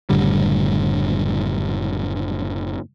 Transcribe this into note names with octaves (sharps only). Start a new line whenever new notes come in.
F#1 A2 D3 G3